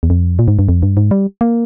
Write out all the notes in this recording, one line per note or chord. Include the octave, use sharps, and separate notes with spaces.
E2
F2
A#2
G#2
G2
F2
G2
G#2
G3
A#3